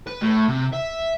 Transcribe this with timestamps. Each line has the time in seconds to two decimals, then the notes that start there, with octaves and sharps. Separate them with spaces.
0.07 B4
0.22 A2
0.49 C3
0.73 E5